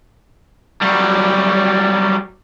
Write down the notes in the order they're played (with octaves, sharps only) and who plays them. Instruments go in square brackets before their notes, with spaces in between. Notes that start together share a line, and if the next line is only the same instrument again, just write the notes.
[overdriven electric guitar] F#3 G3